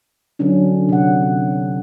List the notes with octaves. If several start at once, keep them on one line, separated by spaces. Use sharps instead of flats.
D3 F#3 C#4 D4
C3 F#5